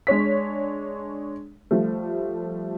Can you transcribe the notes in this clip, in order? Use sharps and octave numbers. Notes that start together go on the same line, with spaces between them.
G#3 D4 C#5 B6
F3 G3 A3